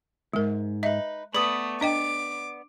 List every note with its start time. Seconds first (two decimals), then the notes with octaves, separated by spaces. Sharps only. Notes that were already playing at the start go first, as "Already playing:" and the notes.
0.33 D#2 G#2 G#3 A#4
0.83 D#4 B4 E5
1.34 A3 B3 B4 D5 B5 D#6
1.81 D4 D#5 G5 D6